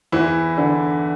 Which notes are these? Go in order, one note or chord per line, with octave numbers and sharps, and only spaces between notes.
E2 E3 E4
D3